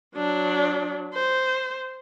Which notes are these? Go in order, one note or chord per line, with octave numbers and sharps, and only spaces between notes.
F#3 D4
C5